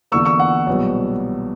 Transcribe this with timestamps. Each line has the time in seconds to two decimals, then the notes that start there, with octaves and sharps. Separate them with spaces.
0.12 E2 D3 A#3 C#6 E6
0.25 C#6 E6
0.40 F#5
0.67 B1 A#2 G3 B3